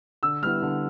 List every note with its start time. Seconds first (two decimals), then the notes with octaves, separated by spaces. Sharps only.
0.23 D3 E6
0.42 G3 B3 E4 F6
0.62 D3